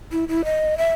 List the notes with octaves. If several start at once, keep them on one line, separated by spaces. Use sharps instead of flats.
E4
E4
D#5
E5